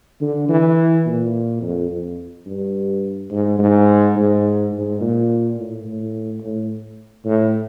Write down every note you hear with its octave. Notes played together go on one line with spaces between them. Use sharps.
D3
E3
A#2
F2
F2
G2
G#2
G#2
G#2
G#2
A#2
A2
A2
A2
A2